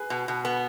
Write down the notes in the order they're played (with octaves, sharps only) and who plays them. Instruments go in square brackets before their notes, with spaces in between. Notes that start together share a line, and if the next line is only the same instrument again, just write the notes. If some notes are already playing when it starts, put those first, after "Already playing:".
Already playing: [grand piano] G#4 B4
[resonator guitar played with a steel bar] B2
B2
B3